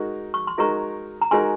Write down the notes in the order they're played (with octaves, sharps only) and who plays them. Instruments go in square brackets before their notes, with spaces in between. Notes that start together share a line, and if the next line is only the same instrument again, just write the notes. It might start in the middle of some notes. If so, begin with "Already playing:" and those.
Already playing: [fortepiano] G#3 D#4 F#4 A#4
[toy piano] C#6
C6
[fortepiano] G#3 D#4 F#4 A#4 [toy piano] A#5 C#6
[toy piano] A#5
[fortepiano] G#3 D#4 F#4 A#4 [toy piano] G#5 C6